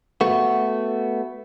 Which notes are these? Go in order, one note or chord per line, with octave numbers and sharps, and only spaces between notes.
A3 B3 F#4